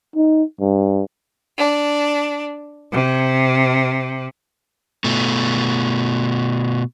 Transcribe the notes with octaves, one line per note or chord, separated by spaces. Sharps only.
D#4
G2
D4
C3
B2 A3